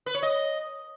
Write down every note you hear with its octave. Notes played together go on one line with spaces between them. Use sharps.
B4
C#5
D#5